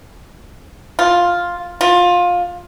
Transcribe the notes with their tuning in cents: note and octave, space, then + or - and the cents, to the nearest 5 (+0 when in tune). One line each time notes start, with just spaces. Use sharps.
F4 +5
F4 +20